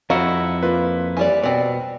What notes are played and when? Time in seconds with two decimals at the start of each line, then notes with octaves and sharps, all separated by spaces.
0.10 F2 E4 F#4 D#5 F5 F#5 A#5
0.63 A#3 F4 B4
1.17 E3 G3 D5
1.44 B2 C4 D5